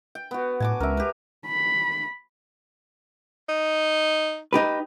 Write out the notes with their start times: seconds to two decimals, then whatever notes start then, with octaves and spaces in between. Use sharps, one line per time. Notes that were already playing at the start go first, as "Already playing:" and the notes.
0.15 G5
0.31 B3 F#4
0.60 A2 G#5 A5 D6
0.80 C#2 A#4 E5
0.97 G4 B4
1.46 B5
3.49 D#4
4.53 D#4 G4 B4